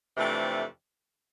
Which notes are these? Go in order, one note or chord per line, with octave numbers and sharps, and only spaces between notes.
F2 C3 E3 A3 D4